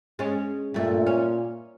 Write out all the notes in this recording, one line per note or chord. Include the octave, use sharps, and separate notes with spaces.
G#3 C#4
G2 A#2 A3
C#4